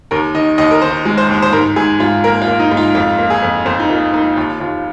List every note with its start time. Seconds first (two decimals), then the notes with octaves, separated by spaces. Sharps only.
0.11 D#2 A#4
0.34 D#3 D#5
0.58 D#2 D#5
0.71 A#4
0.82 D#3 C5
1.05 G#3
1.18 C5
1.29 D#2
1.42 C5
1.53 G#2 A#4
1.76 G#2 G#4
2.00 G#2 F4
2.24 A#3 A#4
2.42 F4
2.47 A#3
2.60 D#4
2.71 G#2
2.77 F4
2.95 F2 F4
3.19 A#3
3.30 G#4
3.42 F2
3.66 F2 C5
3.80 D#4
3.89 A#3 F4
4.13 A#3 D#4
4.36 D#2 F4
4.60 D#2 F4